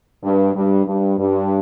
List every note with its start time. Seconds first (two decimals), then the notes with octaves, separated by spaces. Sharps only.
0.23 G2
0.54 G2
0.86 G2
1.18 G2